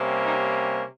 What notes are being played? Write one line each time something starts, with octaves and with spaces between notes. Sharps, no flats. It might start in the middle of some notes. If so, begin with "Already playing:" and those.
Already playing: C3 G3 A#3 C#4
D#4